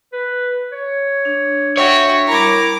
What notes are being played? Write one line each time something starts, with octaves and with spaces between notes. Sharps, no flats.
B4
C#5
D4
F#4 C#5 E5 G5
G3 E4 A#4 A#5 D6